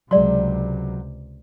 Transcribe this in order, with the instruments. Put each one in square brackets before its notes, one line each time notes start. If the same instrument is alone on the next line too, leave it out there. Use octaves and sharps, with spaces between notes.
[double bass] C#2 C3 [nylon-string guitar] F#3 G#3 [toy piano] D5 C6